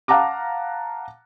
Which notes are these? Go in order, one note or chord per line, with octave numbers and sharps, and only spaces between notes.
F5 F#5 A5 A#5 D6